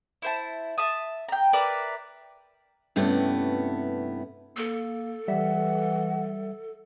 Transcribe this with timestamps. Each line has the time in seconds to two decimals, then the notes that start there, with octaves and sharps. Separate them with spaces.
0.22 E4 C5 A5
0.78 E5 A5 D#6
1.29 G5 A#5
1.53 A#4 B4 D5 E5
2.96 G2 C3 A3 B3 C#4 E4
4.57 A#3 A4
5.28 E3 G3 E5 F#5